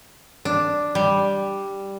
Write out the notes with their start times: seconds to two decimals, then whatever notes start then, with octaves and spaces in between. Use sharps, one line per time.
0.45 D4
0.95 G3